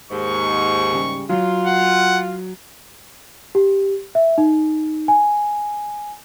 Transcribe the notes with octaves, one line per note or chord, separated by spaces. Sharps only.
D#2 G#2 C#6
C#3 G3
F#3 F4
F#5
G4
E5
D#4
G#5